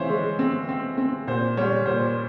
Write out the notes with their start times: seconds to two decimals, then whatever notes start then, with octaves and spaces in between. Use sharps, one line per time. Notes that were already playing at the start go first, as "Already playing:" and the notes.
Already playing: E3 C4 C5 C#5 E5 F5
0.09 G#3
0.39 C4
0.69 C4
0.97 C4
1.27 A#2 C5
1.57 G3 C#5
1.86 A#2 C5